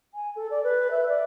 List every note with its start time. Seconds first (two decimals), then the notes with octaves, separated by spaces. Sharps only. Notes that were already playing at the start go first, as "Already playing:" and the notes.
0.14 G#5
0.35 A4
0.50 D5
0.63 B4
0.90 E5
1.08 D5